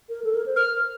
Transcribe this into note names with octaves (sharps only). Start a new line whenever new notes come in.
A#4
A4
A#4
C5
A#4 F6